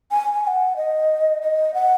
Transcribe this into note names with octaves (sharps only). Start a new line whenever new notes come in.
G#5
G#5
G#5
F#5
D#5
D#5
F#5